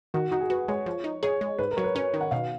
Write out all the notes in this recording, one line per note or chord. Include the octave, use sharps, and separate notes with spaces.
D#3 F#4
D#4 F#4
G#4
F#4 B4
G#3 C#5
F3
D#4
G#4 C#5
G#3
G#2 B4
A#4
F#3 C#5
B4
C#4 C#5
D#3
F#5
B2 F5